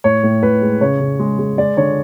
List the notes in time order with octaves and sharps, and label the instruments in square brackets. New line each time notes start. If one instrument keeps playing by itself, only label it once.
[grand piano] A2 C#5
A2
A2 B4
G#3
C#3 C#5
C#3
G#3
G#3
G#3 D5
D3 C#5